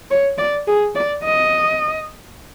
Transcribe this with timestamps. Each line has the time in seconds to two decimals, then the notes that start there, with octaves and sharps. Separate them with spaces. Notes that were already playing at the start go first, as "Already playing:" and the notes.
0.11 C#5
0.38 D5
0.67 G#4
0.95 D5
1.24 D#5